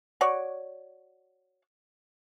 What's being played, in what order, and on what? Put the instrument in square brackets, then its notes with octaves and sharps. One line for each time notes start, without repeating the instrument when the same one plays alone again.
[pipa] F#4 C#5 D5